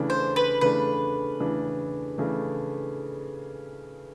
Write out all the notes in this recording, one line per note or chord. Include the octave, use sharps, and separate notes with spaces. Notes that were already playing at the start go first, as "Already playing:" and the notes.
Already playing: C#3 E3 A3 D4
C5
B4
C#3 E3 A3 D4 B4
C#3 E3 A3 D4
C#3 E3 A3 D4